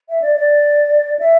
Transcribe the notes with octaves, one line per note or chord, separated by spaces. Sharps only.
E5
D5
D5
E5